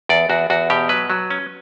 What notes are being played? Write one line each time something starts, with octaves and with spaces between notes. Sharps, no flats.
E2 D5
E2 F#4
E2 F#4
B2 G4
F#3 B4
F#3
C#4